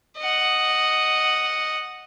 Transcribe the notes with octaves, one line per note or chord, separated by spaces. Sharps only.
D#5 F#5